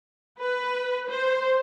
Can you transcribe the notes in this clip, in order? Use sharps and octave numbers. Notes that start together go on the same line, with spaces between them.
B4
C5